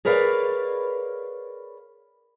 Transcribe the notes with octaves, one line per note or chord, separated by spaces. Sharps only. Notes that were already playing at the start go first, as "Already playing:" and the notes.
G#4 A#4 B4 C#5 D5 F5